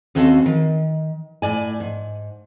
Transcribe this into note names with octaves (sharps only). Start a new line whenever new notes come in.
D#2 C4 C#4 F#4 A4 F5
D#3
A2 D5 G#5
G#2